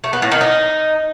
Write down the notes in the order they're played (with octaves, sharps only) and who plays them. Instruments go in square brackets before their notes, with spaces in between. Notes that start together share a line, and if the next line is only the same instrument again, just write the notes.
[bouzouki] A3
B3
A2
D#3
D#4